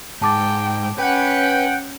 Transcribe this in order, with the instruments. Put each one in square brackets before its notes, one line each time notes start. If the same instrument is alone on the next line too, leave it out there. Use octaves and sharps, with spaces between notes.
[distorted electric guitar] G#2 [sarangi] G5 [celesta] A5 D6 A6
[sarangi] C#4 [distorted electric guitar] B4 [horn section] F#5 G5